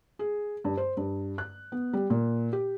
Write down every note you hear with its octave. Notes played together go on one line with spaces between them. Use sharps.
G#4
G2
C5
G2
F#6
B3
G3
A#2
G4